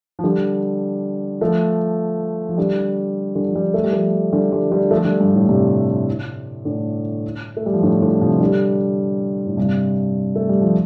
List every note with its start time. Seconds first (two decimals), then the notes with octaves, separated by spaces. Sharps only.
0.19 F3
0.24 D3 G3
1.41 F3 A3
2.49 F3
2.58 D3 G3
3.35 D3 G3
3.48 F3
3.55 D3 G3
3.74 A3
3.84 G3
3.92 F3 A3
4.32 D3 G3
4.52 D3 G3
4.71 D3 G3
4.91 F3 A3
5.05 D3 G3
5.21 G2
5.35 A2
5.49 G2 C3
6.65 A2 D3
7.57 A3
7.66 G3
7.73 F3
7.83 A2 D3
8.01 A2 D3
8.21 C3 F3
8.40 D3 G3
9.46 A2
9.57 G2 C3
10.36 A3
10.49 G3
10.61 F3